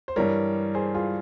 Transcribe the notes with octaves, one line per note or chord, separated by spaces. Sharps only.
C5
G2 E3 G3 A#4 C#5
G#4 C5
F4 G#4